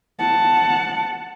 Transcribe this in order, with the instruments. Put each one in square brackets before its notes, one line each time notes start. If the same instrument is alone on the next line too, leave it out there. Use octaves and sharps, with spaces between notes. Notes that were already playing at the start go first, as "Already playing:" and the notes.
[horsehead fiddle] F#5 A5